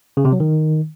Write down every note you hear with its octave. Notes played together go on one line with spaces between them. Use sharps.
C#3
C3
F#3
D#3